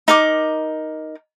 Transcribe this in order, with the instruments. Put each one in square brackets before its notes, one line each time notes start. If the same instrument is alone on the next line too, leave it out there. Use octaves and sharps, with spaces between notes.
[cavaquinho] D#4 A#4 D6